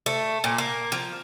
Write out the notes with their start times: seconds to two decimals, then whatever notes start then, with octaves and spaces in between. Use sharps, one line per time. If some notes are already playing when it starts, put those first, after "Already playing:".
0.06 A3
0.44 A#2
0.58 A#3
0.92 F3